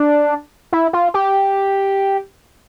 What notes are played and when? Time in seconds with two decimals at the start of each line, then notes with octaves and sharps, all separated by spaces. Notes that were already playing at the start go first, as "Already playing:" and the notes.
Already playing: D4
0.72 E4
0.93 F4
1.14 G4